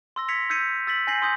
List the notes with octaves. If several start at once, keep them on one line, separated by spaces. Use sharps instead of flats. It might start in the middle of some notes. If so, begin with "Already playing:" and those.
C6 E6 A#6
G#6 A#6 B6 C#7 F7
E6 G6 G#6 B6 C#7 D#7
E6 A6 B6 F#7
G#5 G6 A#6 C7 F#7
C6 D#6 G6